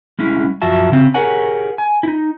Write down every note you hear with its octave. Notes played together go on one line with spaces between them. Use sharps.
G3 G#3 C#4 E4
F#2 F3 F#4 E5 A5
C#3 C4
G4 G#4 A#4 C#5 F#5 G#5
G#5
D#4 E4